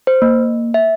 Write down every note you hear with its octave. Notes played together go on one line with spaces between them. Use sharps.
C5
A#3
E5